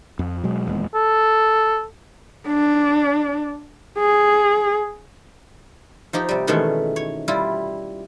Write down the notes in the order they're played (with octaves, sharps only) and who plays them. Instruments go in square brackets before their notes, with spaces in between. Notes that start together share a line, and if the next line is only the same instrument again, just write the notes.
[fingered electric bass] F2
B2 F#3 G#3
D#1 E2 G#3
[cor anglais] A4
[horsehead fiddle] D4
G#4
[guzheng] F3 D#4 G4
C3 G3
B2 D#3 E3 G#3 A3 C#4
C#5
G3 E4 F4